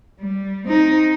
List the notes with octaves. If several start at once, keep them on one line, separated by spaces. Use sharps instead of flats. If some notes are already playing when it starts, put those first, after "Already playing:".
G3
C4 D#4